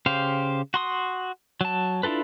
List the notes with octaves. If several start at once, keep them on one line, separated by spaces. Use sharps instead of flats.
C#3 G4 C5 F5
F#4 C6 D#6
F#3 A5
D4 E4 F4 A4 B4